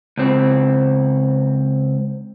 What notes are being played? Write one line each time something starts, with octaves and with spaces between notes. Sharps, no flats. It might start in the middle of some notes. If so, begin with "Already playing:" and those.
C#2 C4